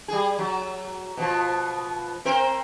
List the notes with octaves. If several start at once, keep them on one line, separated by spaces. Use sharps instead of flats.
G3 G#4
F#3
B2 F3
C4 A#4 C5